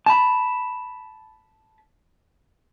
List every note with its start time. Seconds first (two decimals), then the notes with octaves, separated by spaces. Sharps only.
0.06 A5 B5